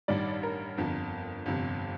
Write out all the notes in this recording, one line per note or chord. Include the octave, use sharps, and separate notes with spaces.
A1 G2 D#3 G3 D5
A#4
G1 F2 D3
G1 F2 C3